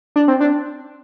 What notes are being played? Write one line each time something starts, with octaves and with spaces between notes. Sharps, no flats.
D4
C4
D4